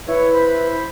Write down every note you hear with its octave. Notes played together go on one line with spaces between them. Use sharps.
E4 B4 C#5
C5 B5